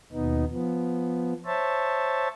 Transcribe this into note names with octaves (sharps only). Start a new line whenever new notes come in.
D#2 B2 B3 D#4
F3 B3
C5 C#5 E5 A5